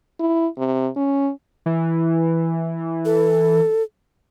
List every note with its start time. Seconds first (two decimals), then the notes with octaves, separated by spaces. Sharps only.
0.19 E4
0.58 C3
0.96 C#4
1.66 E3
3.05 A4